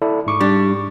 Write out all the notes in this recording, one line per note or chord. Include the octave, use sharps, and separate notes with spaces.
E4 A4 D5
G#2 C#6 D6
G3 D4